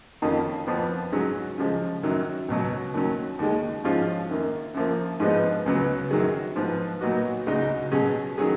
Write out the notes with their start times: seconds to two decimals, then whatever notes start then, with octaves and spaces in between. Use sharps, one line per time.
0.22 F2 D#3 A#3 C#4 F4
0.67 F2 F3 B3
1.12 G#2 F#3 C#4 G#4
1.58 C#3 F3 G#3
2.03 F#2 D#3 F#3
2.48 C#2 B2 F#3
2.94 D#2 D#3 F#3 C#4
3.39 D#2 D#3 G#3
3.84 G#2 F3 G#3 C#4 F4
4.30 F#2 D#3 A#3
4.74 F#2 F3 A#3
5.20 G#2 F3 G#3 B3 D#4
5.66 C#2 C#3 F#3 B3
6.11 F#2 D#3 F#3 C#4 G#4
6.56 G#2 F3 B3
7.01 A#2 F#3 B3 D#4 F#4
7.46 C#2 C#3 G#3 D#4 F#4
7.92 B2 F#3 C#4 G#4
8.38 D#3 F#3 C#4 G#4